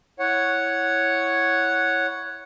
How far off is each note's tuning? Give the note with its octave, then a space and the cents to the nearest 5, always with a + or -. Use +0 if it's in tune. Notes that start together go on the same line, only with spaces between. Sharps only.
E4 +0 C#5 +0 F#5 +0